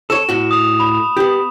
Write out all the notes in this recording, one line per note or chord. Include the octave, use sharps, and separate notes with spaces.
A4 C#5 E7
A2 F#4
D#6 F7
B5
B3 G4